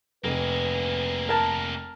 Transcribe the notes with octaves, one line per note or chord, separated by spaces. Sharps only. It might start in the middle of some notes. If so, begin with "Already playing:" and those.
F1 A#3 G#4 B4
A#4 A5